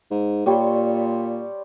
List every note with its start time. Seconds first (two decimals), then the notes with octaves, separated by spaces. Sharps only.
0.11 G#2
0.46 A#2 G3 C#5 C6